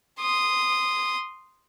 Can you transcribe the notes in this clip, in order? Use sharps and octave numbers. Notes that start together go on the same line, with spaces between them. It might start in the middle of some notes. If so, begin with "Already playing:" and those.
C6 D#6